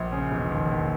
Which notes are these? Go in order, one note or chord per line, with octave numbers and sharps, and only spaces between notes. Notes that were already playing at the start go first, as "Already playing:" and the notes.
Already playing: A#1
C#3
E1
D#2
D#2